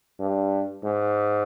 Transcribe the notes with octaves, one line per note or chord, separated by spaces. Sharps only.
G2
G#2